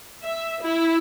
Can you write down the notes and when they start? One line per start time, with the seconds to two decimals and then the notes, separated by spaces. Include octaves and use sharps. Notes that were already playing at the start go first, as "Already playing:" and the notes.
0.23 E5
0.63 E4